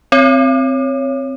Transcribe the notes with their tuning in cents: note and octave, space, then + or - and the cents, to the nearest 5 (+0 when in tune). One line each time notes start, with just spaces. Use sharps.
C4 +0 C#5 +0